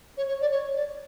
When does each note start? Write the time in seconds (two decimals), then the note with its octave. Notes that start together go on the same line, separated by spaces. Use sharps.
0.17 C#5
0.28 C#5
0.41 D5
0.52 C#5
0.75 D5